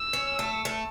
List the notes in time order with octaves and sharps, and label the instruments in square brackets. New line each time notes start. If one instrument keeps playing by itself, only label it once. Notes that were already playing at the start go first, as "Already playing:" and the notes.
Already playing: [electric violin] E6
[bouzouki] C#4
A3
A3